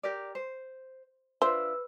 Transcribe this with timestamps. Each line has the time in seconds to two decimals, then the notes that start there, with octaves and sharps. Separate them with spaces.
0.03 G4 A#4 D5
0.35 C5
1.42 D4 F4 B4 C5 E5 E6